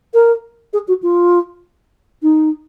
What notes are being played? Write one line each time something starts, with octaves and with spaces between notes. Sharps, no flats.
A#4
G#4
F#4
F4
D#4